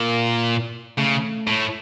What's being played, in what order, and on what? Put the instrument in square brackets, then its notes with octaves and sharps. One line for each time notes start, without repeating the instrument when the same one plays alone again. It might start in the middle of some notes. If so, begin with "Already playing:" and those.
Already playing: [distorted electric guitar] A#2 [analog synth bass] A#3
[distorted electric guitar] C#3 [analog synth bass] A3
[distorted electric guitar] A2